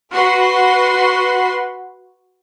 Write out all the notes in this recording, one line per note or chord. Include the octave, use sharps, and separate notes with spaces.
F#4 B4 F#5 C6